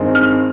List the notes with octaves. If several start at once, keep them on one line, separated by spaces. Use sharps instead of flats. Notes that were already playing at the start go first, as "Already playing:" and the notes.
Already playing: G2 D#3 G#3 C4
F6